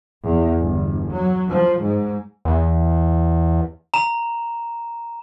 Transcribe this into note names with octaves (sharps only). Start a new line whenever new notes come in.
E2
G1
F#3
F3
G#2
E2
A#5 E7